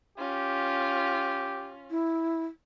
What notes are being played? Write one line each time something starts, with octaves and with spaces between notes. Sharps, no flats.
C#4 F4 G4
E4